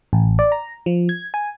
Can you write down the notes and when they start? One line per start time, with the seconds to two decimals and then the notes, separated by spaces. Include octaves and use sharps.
0.13 A1
0.39 D5
0.52 A#5
0.86 F3
1.09 G#6
1.34 G#5